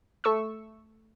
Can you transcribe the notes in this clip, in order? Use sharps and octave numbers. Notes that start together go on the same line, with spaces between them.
A3 C#6 E6